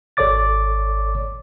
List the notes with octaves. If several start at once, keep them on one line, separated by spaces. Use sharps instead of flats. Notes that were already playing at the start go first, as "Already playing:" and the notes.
G#1 A4 C#5 D5 D6 A6